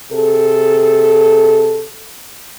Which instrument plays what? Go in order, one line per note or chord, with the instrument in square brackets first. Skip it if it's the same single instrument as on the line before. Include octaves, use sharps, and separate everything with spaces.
[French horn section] C3 G#4 A4